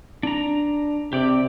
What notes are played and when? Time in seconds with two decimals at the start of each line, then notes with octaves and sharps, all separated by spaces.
0.23 D4 A#5
1.13 C3 G4 D5